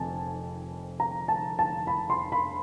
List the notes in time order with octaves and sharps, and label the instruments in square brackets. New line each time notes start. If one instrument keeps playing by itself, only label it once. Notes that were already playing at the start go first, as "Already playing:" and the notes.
Already playing: [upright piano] F1 F2 G#5 A5
A#5
A5
A5
B5
C6
B5